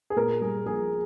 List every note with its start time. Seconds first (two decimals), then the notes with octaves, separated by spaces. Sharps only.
0.10 G#4
0.16 A#2 A#4
0.41 G3 G#4
0.66 A#1 G#4